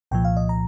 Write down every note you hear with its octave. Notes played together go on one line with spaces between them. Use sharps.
C2 A#2 F3 G5
F5
D#5
A#5